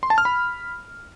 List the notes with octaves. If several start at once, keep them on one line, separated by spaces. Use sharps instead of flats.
C6
A5
F6
B5